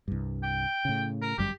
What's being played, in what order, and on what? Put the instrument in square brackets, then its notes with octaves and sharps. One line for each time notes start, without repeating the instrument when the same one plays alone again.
[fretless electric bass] C2 G2
[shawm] G5
[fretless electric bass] A2 C#3
[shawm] A#4
[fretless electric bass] G1 F#2 G3 [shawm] G4